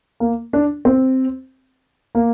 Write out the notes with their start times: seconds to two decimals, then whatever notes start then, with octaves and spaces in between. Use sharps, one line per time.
0.20 A#3
0.53 D4
0.85 C4
2.15 A#3